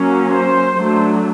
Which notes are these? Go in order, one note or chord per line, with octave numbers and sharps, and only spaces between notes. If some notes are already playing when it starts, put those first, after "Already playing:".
Already playing: F#3 A#3 C#4
C5
F#3 A3 D4